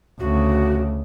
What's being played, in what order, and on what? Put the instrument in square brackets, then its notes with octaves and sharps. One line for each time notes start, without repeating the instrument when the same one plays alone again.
[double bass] D2 C#3 [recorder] F#4